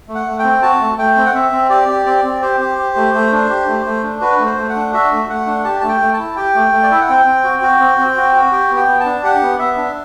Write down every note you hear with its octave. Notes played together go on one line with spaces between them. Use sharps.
A3
F#5
A3
C4 G5
F#4 A5
A3
A3 G5
C4
F#5
C4 E5
C4
G4 D5
G4
C4 D5
C4
G4 C5
G4
G4
A3
A3
D4
G4
A3
A3
D4
F#4 B4
A3
C5
A3
F#5
D4
F#4 E5
A3
A3 F#5
D4
G4 A5
A3 A5
G5
A3
E4 A5
G4 G5
A3
A3
D5
E4 E5
F#5
C4 G5
C4
F#4
F#4
C4
C4
F#4
F#4
G4 G5
B3
G5
B3
A5
D4
G4 F#5
B3
B3 E5
D4